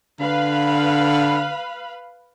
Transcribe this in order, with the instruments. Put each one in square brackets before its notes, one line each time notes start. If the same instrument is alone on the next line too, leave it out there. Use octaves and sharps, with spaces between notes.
[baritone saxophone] D3 [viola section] B4 F5 B5